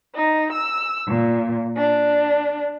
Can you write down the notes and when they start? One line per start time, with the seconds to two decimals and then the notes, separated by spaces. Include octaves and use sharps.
0.15 D#4
0.54 E6
1.08 A#2
1.78 D4